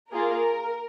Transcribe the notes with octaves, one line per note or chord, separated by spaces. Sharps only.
A#3 F4 G#4 A#4